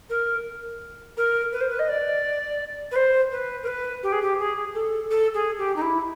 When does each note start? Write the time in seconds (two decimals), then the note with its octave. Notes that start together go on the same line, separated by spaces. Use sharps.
0.09 A#4
1.17 A#4
1.52 B4
1.60 C5
1.69 B4
1.79 D#5
1.88 D5
2.91 B4
2.95 C5
3.31 B4
3.63 A#4
3.67 B4
4.03 G4
4.12 G#4
4.22 G4
4.39 G#4
4.74 A4
5.10 A4
5.34 G#4
5.58 G4
5.76 D#4
5.81 E4